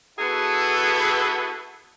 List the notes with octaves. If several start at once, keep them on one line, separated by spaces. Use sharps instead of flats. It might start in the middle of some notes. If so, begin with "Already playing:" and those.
B3 E4 F#4 G#4 A4 B4